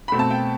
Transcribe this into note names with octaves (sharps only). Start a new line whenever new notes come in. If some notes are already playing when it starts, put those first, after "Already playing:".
B2 A3 C4 B5
A5
G5